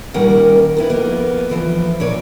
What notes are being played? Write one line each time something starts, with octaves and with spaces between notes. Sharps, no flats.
A#2 D#3 G3 C#4 A#4 F#5
D#3 B3 E4
F2 A#3 B3
D2 E3 F3
A#2 C#4 C#5 D5